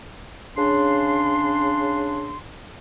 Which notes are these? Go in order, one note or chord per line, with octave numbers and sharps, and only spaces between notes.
C#3 D4 C6